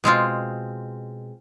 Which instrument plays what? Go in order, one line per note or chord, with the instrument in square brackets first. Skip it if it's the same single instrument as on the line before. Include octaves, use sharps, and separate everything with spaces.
[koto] B2 G#3 C4 F4